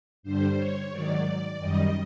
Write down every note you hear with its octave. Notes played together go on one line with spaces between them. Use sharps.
G2 D3 G3 C5
C#5
G#2 D#3 F#3 D5
F#2 D#3 G3 D#5